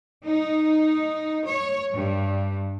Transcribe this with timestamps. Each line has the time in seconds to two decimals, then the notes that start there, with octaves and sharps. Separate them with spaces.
0.24 D#4
1.45 C#5
1.93 G2